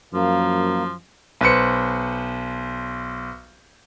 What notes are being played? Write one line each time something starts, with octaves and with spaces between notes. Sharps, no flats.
F#2 F3 A#3
B1 B4 C5 C#7